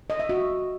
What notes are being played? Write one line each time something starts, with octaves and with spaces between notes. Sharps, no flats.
D#5
E5
F#4